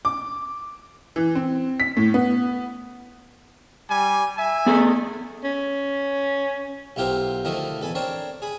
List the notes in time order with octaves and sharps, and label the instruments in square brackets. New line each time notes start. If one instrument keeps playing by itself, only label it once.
[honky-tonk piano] D6
E3
C4
B6
A2
B3
[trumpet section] G3 G#5
E5 G#5
[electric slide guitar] B3 G#4 A4
[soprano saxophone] C#4
[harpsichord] B1 E4 F4 G4 A#4 C5
D2 D#3 F3 A3 E4 D#6
E2 A4 G#5 B5
C4 D4 A#4 C#5 D5
G#4 G#5 B5